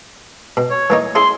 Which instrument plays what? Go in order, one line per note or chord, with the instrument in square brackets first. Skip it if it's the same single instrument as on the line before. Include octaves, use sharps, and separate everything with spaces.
[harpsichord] B2
[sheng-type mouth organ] C#5
[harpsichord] E3 A#3 D#4
[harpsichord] C#4 E4 G#4 [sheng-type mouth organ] C6